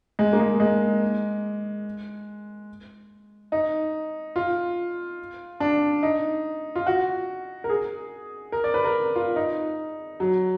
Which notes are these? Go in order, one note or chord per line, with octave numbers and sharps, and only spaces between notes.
G#3
A#3
G#3
G#3
D#4
F4
D4
D#4
F4
F#4
A#4
G#4
A#4
D5
B4
A#4
F4
D#4
F#3